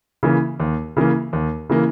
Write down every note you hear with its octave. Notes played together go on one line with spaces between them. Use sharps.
C#3 E3 A#3
D#2
C#3 E3 A#3
D#2
C#3 E3 A#3